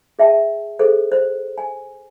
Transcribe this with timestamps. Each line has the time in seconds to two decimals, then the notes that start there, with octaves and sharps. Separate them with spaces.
0.19 G#4 E5 G5 A5
0.79 G#4 A4 C5
1.12 C5
1.58 G#5